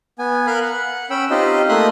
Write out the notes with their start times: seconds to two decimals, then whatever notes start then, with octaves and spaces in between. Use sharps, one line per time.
0.19 B3 G#5
0.47 A#4 F5 B5 F#6
0.62 F#5
1.10 C#4 G5 B5 E6
1.30 C4 D#4 F4 G4 C5 D#5
1.69 A3 A#3 E5 C6 D#6 F#6